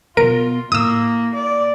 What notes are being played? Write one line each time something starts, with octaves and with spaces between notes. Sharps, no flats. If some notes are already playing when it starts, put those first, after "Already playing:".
B2 B3 F4 A#4 D7
A2 A#3 D#6 E6
D5